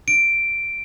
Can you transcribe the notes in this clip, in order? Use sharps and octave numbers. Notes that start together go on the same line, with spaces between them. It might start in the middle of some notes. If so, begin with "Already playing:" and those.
D7